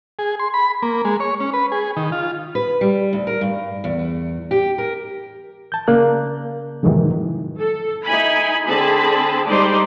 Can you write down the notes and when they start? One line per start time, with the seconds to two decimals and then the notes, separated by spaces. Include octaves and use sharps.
0.19 G#4
0.40 C6
0.54 B5
0.82 A#3
1.05 G#3
1.20 C#5
1.40 C#4
1.53 B4
1.72 G#4
1.97 D#3
2.12 F4
2.55 B4
2.81 G3
3.13 D2
3.27 A#4
3.41 G2
3.84 E2
4.51 G4
4.78 A#4
5.72 A5 G6
5.88 C#3 A#3 D5 F#6
6.83 F2 G#2 C3 D#3 E3 F#3
7.59 A4
8.07 D#4 E4 G#5 B5
8.67 D3 C4 G#4 A5 B5
9.47 G3 G#3 D#4 C5 D5